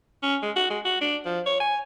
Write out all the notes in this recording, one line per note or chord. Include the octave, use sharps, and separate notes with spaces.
C#4
G#3
F#4
G#3
F#4
D4
F3
C#5
G#5